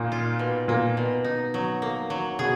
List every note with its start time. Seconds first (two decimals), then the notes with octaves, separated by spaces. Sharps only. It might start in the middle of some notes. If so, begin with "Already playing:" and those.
Already playing: A#2 A#3 D#4
0.12 F4
0.39 B2
0.68 A#2 A#3
0.97 B2
1.24 D#4
1.54 F#3
1.82 A#3
2.10 F#3
2.39 B2 G#4